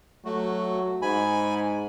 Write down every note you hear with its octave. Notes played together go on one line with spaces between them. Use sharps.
F#3 A3 F#4
G#2 G#5 B5